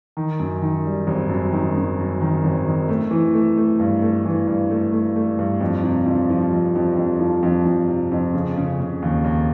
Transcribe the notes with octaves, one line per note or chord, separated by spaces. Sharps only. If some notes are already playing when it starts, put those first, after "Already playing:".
D#3
F#2
D#3
G3
G#1
F#2
D#3
F#2
F#2
D#3
G#1
D#3
A3
E3
A3
A3
G2
A3
E3
G2
A3
A3
A3
G2
F2
C3
F2
F3
F2
F2
F2
F3
F2
F2
C3
F2
C#3
C#3
C#3
D#2
D#2